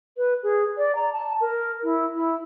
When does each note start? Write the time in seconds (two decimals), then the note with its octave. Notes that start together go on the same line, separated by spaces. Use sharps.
0.17 B4
0.43 G#4
0.77 D5
0.95 A#5
1.13 A5
1.41 A#4
1.83 E4
2.15 E4